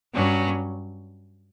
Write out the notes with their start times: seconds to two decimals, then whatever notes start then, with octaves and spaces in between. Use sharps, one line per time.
0.14 G2 F#3 C#4